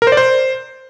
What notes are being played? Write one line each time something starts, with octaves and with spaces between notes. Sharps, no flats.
A#4
C5
D5
C5